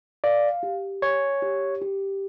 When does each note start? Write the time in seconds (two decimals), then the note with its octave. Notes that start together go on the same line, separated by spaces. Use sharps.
0.24 D5 F5
0.63 G4
1.02 C#5 G#5
1.42 G4
1.82 G4